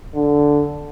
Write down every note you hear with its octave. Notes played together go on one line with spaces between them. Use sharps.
D3